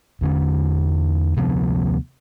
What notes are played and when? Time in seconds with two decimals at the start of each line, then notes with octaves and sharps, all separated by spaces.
0.21 E2 D3 C#4
1.37 D2 C3 F3 B3